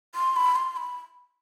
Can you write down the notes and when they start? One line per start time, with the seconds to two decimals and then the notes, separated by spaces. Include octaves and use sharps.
0.15 C6
0.36 B5
0.56 C6
0.76 B5